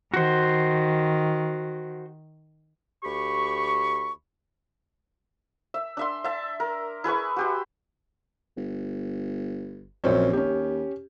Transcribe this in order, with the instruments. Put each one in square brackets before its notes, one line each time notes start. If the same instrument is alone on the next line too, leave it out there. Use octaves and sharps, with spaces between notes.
[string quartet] D#3 [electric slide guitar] F#4 C5
[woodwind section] D2 G4 B5 C#6
[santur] E5
D4 E5 C6
E5 A5
A#4
E4 G#4 B4 C#6
F#4 G4 C6
[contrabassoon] G1
[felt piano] A#1 C4 C#4 [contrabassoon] F#2
[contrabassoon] D#2 [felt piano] C#4 G4